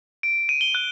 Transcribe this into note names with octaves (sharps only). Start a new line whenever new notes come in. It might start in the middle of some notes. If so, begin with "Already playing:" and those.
D7
D#7
G7
F#6